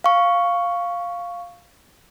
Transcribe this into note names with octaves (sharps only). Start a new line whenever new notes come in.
F5 C#6